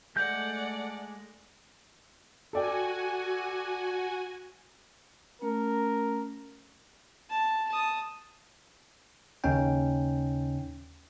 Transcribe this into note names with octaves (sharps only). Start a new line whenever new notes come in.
G#3 A3 D5 F#5 G6
F#4 A4 D5 G5 G#5
A3 C#4 A#4
A5
A5 D#6
D#2 C#3 C#4 D#4 G5